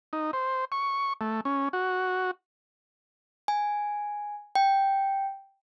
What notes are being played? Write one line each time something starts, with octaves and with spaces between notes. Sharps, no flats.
D#4
C5
C#6
A3
C#4
F#4
G#5
G5